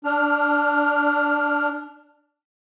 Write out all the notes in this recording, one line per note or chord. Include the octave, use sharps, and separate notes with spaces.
D4 F6